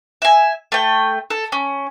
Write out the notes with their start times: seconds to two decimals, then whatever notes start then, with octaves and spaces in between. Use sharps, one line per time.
0.22 E5 G#5
0.72 A3 G5
1.30 A4
1.52 C#4